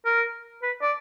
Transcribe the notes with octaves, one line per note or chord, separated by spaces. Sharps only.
A#4
B4
D5